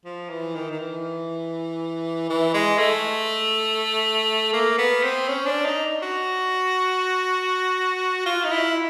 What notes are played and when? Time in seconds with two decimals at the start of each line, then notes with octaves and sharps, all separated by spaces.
0.05 F3
0.30 E3
0.55 D#3
0.71 D#3
0.80 E3
2.30 E3
2.54 G#3
2.79 A3
4.53 A#3
4.78 B3
5.03 C4
5.28 C#4
5.46 D4
5.65 D#4
6.02 F#4
8.26 F4
8.44 D#4
8.52 E4